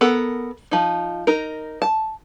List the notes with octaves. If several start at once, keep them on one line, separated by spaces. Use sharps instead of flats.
B3 A4 A#4
F3 D#4
D#4 A#4
A5